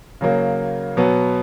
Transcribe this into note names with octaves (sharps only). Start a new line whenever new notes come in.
C#3 F#3 A#3
B2 F#3 B3